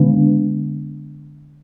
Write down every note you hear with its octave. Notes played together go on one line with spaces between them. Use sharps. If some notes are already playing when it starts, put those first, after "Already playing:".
Already playing: D3 G#3 B3 D4